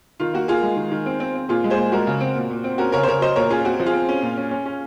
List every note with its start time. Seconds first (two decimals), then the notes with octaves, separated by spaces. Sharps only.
0.20 D#3 F4
0.34 A#3 F#4
0.48 A#3 F4 G#4
0.62 G#3
0.77 D#3
0.92 D#3
1.06 C4
1.20 C4
1.35 C4
1.49 A#2 F4 G#4
1.64 G#3
1.70 G#4 C5
1.77 A#2
1.92 G#3 F#4 A#4
2.07 C#3
2.20 C4
2.36 A#2
2.50 A#2
2.64 C4
2.78 C#4 F#4 A#4
2.92 C#3 A#4 C#5
3.03 C5
3.07 C#3 A#4 C#5
3.21 F#3 C5 D#5
3.36 A#2 A#4 C#5
3.50 C#4 F4 G#4
3.64 C4 F#4
3.80 F3
3.86 F4 G#4
3.93 C4
4.09 C#4
4.22 A#2
4.37 C#4
4.51 C#4
4.66 C#4